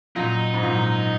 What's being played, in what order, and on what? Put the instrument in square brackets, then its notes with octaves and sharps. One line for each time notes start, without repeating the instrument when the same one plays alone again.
[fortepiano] F#2 A#2 [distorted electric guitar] D#4
[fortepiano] G#2
F#2 A#2
F#2